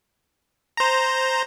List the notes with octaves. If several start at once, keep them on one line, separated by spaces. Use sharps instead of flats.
C5 A#5